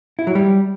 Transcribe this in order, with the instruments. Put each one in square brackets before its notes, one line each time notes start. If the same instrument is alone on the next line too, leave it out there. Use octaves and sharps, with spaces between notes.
[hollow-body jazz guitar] E4
F#3
G3